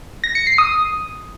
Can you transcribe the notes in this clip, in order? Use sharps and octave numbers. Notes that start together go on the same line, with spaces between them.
A#6
C#7
C7
D#6